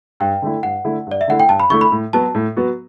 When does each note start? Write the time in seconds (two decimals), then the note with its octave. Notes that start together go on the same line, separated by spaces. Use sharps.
0.20 G2 G5
0.42 D3 A3 E4
0.63 G2 F#5
0.84 D3 A3 E4
1.06 G2
1.11 D5
1.21 E5
1.28 D3 A3 E4 F#5
1.40 G5
1.48 G2 A5
1.60 B5
1.70 D3 A3 E4 C#6
1.81 B5
1.92 A2
2.13 F#3 B3 F#4 A5
2.35 A2
2.57 F#3 B3 F#4